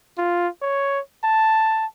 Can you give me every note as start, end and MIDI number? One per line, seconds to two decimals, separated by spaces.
0.18 0.48 65
0.62 1.00 73
1.24 1.86 81